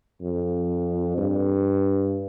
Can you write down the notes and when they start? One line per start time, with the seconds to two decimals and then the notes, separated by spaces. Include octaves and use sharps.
0.22 F2
1.18 G2